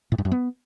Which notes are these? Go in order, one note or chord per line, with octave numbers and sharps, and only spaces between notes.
A2
G2
F#2
B3